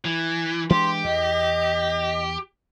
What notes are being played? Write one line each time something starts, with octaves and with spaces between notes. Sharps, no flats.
E3
E3 G#3 D4 G4 C6
E2 D#5